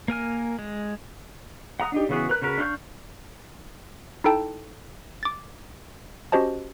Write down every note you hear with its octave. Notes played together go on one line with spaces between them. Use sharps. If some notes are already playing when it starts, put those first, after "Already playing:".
A#3 A#4 G#5 F6
G#3
F#5 A#5 D#6
D4 D#4 G4
C#3 E3 B3 F#4 G#4
A#4 B4 F#6
C#3 F#4 A#4 B4
D4 F5 F#5 C#6 G6
D#4 E4 A4 G5 A5
D6 A6
C#4 F#4 G4 C5 D#5 A5